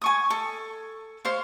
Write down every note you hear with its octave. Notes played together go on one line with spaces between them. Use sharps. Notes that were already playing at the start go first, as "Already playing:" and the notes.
G#5 C#6 D#6
A4
C5 C#5 F5